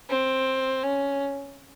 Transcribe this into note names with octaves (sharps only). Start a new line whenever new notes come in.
C4
C#4